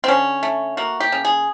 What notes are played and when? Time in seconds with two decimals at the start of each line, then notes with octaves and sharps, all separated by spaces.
0.04 C4
0.08 D3 C#4
0.43 A3
0.77 A#3 F#4
1.00 G4
1.12 C#3
1.25 G#4